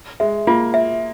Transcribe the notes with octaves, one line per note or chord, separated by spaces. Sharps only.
G#3 E5
A#3 F4
E5